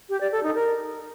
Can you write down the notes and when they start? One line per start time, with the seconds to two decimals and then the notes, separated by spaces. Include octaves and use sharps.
0.09 G4
0.21 D5
0.32 A4
0.43 D#4
0.55 A#4